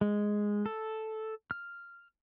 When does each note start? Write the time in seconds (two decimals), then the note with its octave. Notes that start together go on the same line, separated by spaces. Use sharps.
0.01 G#3
0.66 A4
1.51 F6